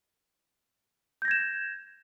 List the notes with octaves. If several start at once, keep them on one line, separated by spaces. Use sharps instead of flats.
G6 G#6 A#6 E7